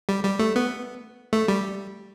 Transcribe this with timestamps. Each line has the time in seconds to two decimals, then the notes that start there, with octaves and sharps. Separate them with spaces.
0.09 G3
0.25 G3
0.39 A3
0.56 B3
1.33 A3
1.48 G3